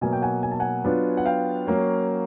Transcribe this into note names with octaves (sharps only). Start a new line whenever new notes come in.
B2 F#3 A#3 G#5
G5
F#5 G#5
G#5
A5
F#5 G#5
F#3 B3 D4 F4
F#5
F5 G5
F#3 A#3 C#4